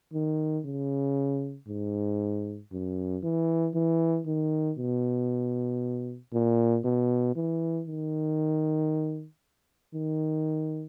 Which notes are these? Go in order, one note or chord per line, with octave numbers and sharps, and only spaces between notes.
D#3
C#3
G#2
F#2
E3
E3
D#3
B2
A#2
B2
E3
D#3
D#3